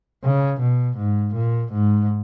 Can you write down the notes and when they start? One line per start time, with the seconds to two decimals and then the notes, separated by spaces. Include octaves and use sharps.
0.24 C#3
0.61 B2
0.97 G#2
1.35 A#2
1.73 G#2